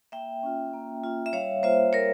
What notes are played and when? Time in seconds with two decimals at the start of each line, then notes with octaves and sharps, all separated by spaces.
0.12 A#3 E5 G5
0.43 C#4 F4
0.74 A#3
1.03 C#4 F4
1.26 E5
1.33 G3 C#5 F5
1.63 A#3 F4 C5 E5
1.93 G3 A#4 C#5